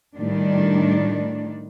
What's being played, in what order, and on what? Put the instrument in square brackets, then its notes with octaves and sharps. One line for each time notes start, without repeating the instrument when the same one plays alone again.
[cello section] A2 D#3 G3 D4